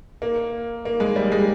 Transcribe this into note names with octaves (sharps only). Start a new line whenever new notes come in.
A#3
A#3
G#3
G3
G#3